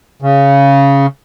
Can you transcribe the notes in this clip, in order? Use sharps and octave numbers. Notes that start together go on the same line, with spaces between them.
C#3